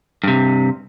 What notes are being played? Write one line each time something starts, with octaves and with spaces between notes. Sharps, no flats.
G2 C3